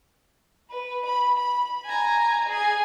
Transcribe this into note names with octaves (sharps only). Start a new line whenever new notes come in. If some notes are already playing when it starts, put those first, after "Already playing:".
B4
B5
B5
G#5 A#5
G#4 G#5